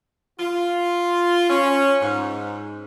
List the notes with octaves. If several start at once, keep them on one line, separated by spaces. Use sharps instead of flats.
F4
C#4
G#2